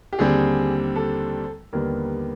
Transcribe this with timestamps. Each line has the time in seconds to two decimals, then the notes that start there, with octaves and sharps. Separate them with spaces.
0.13 G4
0.19 D#2 D3 G3 C4 G#4
0.96 A4
1.73 D#2 D3 G3 B3 A#4